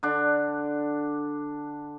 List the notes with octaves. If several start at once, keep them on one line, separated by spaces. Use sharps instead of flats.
D3 D4